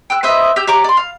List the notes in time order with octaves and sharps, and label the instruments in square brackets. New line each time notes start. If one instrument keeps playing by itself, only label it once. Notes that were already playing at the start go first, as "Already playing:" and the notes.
[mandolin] G5 E6 F#6
B4 C5 D#5 E5
G4 E6 G6
G4 C#5 A#5 D6
D5 C6
F5